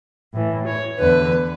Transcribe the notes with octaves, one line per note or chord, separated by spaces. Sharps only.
A2 E3
C#5
E2 D3 B4